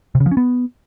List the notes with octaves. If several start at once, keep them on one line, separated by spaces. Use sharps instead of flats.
C3
C#3
F3
C#4
B3